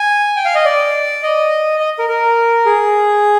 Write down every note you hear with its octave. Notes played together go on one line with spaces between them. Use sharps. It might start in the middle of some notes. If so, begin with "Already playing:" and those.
Already playing: G#5
G5
F5
D#5
D5
D#5
D#5
A#4
A#4
G#4